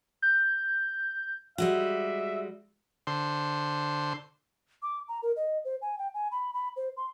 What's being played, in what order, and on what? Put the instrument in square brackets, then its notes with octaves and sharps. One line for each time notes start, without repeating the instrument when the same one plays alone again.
[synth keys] G6
[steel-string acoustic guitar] G3 G#3 F#4 [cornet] E5
[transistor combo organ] D3 C5 C6
[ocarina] D6
A#5
A#4
D#5
C5
G#5
G5
G#5
B5
B5
C5
C6